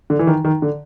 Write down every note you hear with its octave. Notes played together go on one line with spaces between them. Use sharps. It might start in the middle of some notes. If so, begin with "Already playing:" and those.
D3
E3
D#3
D#3
D3